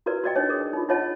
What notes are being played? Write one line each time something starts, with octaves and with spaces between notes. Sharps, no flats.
E4 F#4 A#4 B4 D5
F#4 A#4 D5 D#5 G5
D4 D#4 C#5 D#5
G#4 A#4 D5 D#6
D#4 F4
D#4 F4 C#5 D#5 F#5 A5